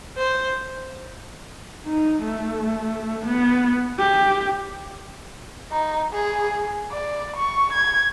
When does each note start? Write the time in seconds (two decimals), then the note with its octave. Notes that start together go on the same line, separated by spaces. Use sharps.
0.17 C5
1.86 D#4
2.23 A3
3.26 B3
3.99 G4
5.71 D#4
6.13 G#4
6.92 D5
7.36 C#6
7.73 G#6